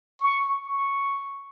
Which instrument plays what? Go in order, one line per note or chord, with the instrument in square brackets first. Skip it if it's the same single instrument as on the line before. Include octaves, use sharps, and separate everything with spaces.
[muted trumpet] C#6
C#6